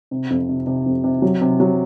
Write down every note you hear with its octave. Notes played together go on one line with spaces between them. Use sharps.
C3
F2
C3
C3
F2
C3
F#3
C3
F#3